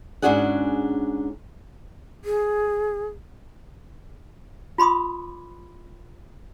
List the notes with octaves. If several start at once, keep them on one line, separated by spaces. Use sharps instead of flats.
G#2 C#4 D4 F#4 G#4 F#5
G#4
F4 B5 C6 D6 D#6